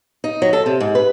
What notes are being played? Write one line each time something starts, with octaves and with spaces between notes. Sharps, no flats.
D#4
F#3
A4
C3
G#2
B4